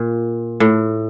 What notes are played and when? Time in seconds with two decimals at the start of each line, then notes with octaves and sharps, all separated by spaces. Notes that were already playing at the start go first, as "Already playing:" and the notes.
Already playing: A#2
0.60 A2